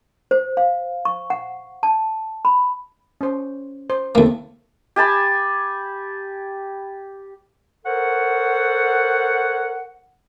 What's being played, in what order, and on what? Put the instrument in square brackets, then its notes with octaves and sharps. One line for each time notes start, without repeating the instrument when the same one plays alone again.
[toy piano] C5
F5
C#6
F#5
A5
B5
[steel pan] C#4 C5
C5
[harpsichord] D#2 A#3 [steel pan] A3 C4 A4
[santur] G4 G#5 A5 B5
[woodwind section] A4 A#4 C5 C#5 F#5